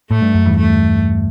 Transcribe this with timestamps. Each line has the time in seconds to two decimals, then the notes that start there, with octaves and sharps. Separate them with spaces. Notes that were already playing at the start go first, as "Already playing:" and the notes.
0.11 A2 A3
0.22 G2
0.35 F#2
0.46 E2 G2
0.58 A3